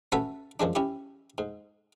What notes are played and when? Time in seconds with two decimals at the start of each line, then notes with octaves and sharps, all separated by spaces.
0.12 A3 C#4 F#4 B4 E5 A5
0.60 F#2 F3 G#3 D4
0.75 C#4 E4 G4
1.38 G#2